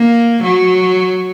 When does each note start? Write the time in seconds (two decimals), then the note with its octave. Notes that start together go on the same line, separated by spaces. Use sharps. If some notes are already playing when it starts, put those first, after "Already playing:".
Already playing: A#3
0.43 F#3